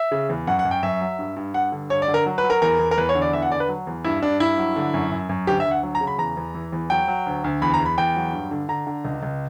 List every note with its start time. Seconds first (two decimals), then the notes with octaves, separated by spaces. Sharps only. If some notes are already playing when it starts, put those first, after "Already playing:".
Already playing: E5
0.12 C#3
0.29 E2
0.47 F#2 F#5
0.59 F#5
0.65 F#2
0.71 G5
0.83 F#2 E5
1.01 F#3
1.19 G2
1.36 G2
1.54 G2 F#5
1.72 D3
1.90 G2 C#5
2.02 D5
2.08 D3
2.14 A#4
2.26 F#3
2.38 B4
2.44 F#3
2.50 A#4
2.62 E2 A#4
2.79 E2
2.91 A#4
2.98 E2 B4
3.09 C#5
3.15 D3
3.22 D5
3.33 E2 E5
3.42 F#5
3.51 D3 D5
3.60 B4
3.69 F#3
3.87 E2
4.04 G2 E4
4.22 G2 D4
4.40 G2 E4
4.58 F#3
4.76 D3
4.94 F#2
5.11 F#2
5.29 F#2
5.47 D2 G4
5.60 E5
5.65 D2
5.71 F#5
5.83 F#3
5.95 A#5
6.01 C#3
6.07 B5
6.18 E2 A#5
6.37 E2
6.55 E3
6.72 E2
6.90 F#3 G5
7.08 F#3
7.26 D2
7.44 D2
7.62 E2 B5
7.74 A#5
7.80 E2
7.86 B5
7.98 E2 G5
8.16 F#3
8.33 G2
8.51 D3
8.69 D3 A#5
8.87 D3
9.05 C#2
9.23 C#2